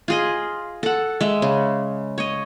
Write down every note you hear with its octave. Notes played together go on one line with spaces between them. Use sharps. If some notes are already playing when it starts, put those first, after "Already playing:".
F4 G#4 D#5
A4 F#5
G#3 E5
C#3
C#5 D#5